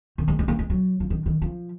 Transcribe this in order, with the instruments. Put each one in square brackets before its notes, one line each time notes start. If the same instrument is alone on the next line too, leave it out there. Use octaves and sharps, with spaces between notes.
[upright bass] D#3
G#3
G#3
A#3
G#3
F#3
F3
D#3
D#3
F3